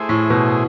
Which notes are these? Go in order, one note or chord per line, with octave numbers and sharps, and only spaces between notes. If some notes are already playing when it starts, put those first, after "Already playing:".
Already playing: A3 E4 G#4 C5
A2
B2